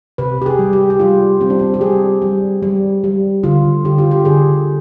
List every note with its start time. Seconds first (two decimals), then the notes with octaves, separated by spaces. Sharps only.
0.18 C3 B4
0.42 G4
0.46 G#4
0.59 G3
0.73 G4
0.90 G4
1.00 G3 F4
1.40 G3 C4
1.50 D4
1.59 C4
1.74 G4
1.81 G3 G#4
2.22 G3
2.63 G3
3.04 G3
3.44 D3 F4
3.85 D3 G4
3.98 F4
4.11 G4
4.25 D3 G#4